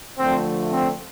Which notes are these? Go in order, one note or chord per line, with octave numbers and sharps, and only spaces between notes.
D3 F3 A3 C4
C4